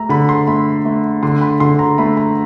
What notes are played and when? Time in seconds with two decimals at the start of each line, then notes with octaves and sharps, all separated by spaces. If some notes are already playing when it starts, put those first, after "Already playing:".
Already playing: A3 A#5
0.09 D3 B5
0.29 C6
0.47 A3 B5
0.85 A3
1.23 D3 C6
1.41 B5
1.60 D3 C6
1.79 A#5
1.98 A3 B5
2.17 A#5